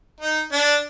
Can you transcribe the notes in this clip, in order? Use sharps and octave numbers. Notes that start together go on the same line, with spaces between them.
D#4
D4